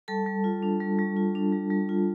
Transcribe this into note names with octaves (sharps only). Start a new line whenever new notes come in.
G3 A4 A5
G3
F4
D4
G3
G3
F4
D4
G3
G3
F4